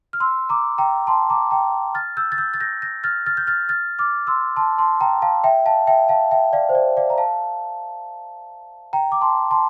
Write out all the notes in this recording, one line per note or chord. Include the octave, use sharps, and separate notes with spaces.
F6
C6 E6
A#5 D6
G5 A#5
A5 C6
A#5 D6
G5 A#5
F6 A6
E6 G6
A6
E6 G6
A6
G6 A#6
G6 A#6
F6 A6
F6 A6
G6
F6 A6
F6 A6
D6 F6
C6 E6
A5 C6
A5 C6
G5 A#5
F5 A5
E5 G5
F5 A5
E5 G5
F5 A5
E5 G5
D5 F5
C5
D5
D5 F5
A#5
F5 A5
G5 A#5
D6
A5 C6
A5 C6